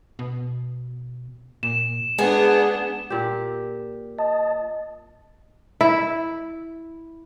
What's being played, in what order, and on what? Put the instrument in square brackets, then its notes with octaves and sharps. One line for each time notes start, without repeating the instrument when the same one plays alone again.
[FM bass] B2
[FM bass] A#2 [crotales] E7
[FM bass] G#3 [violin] B3 D4 [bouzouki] G#4
[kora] A#2 G4
[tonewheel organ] D#5 A5
[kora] E4